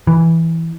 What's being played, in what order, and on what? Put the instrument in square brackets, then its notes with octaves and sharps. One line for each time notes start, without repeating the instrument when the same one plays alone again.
[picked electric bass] E3